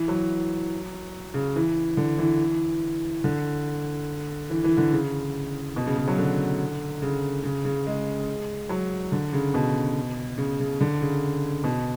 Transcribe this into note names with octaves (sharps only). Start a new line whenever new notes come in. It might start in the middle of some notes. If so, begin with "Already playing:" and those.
Already playing: E3
F#3
C#3
E3
D3
E3
D3
E3
E3
D3
C#3
B2
C#3
C#3
F#3
D3
C#3
C#3
C#3
G#3
F#3
D3
C#3
B2
C#3
C#3
D3
C#3
B2